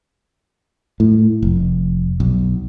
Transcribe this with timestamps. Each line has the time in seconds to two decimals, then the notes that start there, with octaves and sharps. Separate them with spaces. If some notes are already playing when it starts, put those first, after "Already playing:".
1.00 A2
1.43 F1
2.20 B1